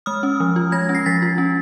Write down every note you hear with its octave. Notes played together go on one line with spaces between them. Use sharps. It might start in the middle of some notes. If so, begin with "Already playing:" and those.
G#3 D#6 F6
C#4
F3
F4
G#3 G#6 A#6
C#4
A#6 C7
F3 A6 B6
F4
C#4